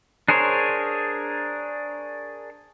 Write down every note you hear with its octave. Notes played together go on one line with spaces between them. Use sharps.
D4 G#4 A#4 C5 C#5